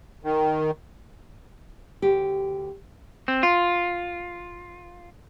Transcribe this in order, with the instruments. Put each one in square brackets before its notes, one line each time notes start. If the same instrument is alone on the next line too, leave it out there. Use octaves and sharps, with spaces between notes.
[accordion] D#3
[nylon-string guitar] D2 G4
[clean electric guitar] C4
F4